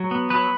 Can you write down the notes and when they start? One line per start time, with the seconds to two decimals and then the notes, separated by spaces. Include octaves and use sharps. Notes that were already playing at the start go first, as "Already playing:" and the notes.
Already playing: F#3
0.11 B3
0.30 F#3 B4